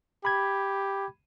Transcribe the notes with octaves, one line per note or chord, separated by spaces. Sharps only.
G4 B5 G#6